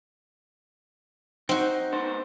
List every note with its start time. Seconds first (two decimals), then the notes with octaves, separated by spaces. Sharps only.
1.49 C4 D#4 F#4
1.92 B3 D#4 C5